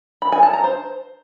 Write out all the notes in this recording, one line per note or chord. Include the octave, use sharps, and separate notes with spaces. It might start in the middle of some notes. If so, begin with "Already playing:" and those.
B5
G#5
A5
A#5
C5